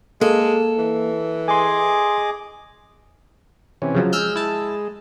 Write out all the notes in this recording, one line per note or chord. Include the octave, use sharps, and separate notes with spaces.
G#3 A#3 A4
E3
G#4 D#5 G#5 C6 D6
C3 E3 C#4
C#3 F3 F#3
G#3 E6 F6 G6
E4 A5